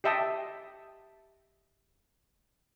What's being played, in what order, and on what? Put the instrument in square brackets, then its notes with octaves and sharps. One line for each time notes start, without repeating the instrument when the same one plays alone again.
[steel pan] G4 D#5 E5 G5 A5 D#6